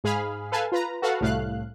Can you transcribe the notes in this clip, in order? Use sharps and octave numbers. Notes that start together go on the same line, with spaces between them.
G#2 G#4 F5 B5 F6
A4 B4 F5 G#5 A5
F4 B4 A#5
F#4 A4 B4 F5 F#5
C2 A2 A3 F5 F#6